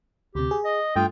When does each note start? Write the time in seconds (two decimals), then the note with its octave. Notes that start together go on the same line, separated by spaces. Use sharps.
0.35 D2 C3 G4
0.51 G#4
0.65 D#5
0.96 G2 A3 F4 G5 D#6